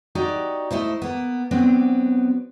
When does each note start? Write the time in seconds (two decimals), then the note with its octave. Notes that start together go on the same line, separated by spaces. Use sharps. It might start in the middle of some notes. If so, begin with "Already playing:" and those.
0.15 D#4 F#4 G4 D5
0.71 A3 D#4 E4 C5
1.02 A#3 B3
1.51 F#3 B3 C4 D4